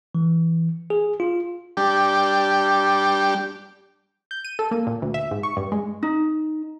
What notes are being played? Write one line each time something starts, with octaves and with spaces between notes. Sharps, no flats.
E3
G#4
F4
G3 D4 G4
G6
D#7
A4
A#3
A#2
D2
E5
G#2
C#6
G2
G#3
D#4